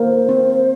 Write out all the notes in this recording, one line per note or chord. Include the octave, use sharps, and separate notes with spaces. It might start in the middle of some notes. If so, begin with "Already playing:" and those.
Already playing: A#3 C5
C4